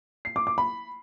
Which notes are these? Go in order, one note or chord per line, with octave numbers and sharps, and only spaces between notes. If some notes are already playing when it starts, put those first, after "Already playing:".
C7
D6
D6
B5